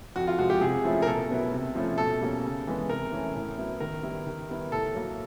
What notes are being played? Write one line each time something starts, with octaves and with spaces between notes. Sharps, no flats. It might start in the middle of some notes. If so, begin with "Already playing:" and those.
F2 F#4
F4
C3 F3 G#3 F#4
G4
C3 G#4
F3 A3 C#4 E4
A#4
B2 A4
F#3 B3 E4
C3
F3 A3 C#4 E4
B2 A4
G3 A#3 C#4
C#3
E3 G#3 B3
C3 A#4
E3 A3 C#4 E4
A2
F#3 B3 E4
D#3 A#4
G3 B3 E4
D#3
G3 B3 E4
A2 A4
F#3 A#3